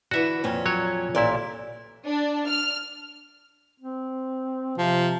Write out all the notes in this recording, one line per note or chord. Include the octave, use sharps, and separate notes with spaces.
D3 E3 F#4 B4 E5
F2 A#2 C#4
F#3 C#5
A1 A#2 E4 D5
D4
F6
C4
C3 F3